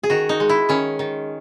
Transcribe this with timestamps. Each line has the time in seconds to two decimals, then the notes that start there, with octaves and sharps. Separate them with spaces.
0.03 G#4
0.10 D#3 F#4
0.29 D#4
0.40 G#3
0.49 E4
0.69 D#3 C#4
0.99 D#3